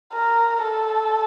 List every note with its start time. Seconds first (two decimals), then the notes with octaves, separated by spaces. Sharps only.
0.13 A#4
0.64 A4